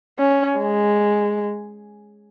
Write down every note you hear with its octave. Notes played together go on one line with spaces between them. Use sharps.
C#4
G#3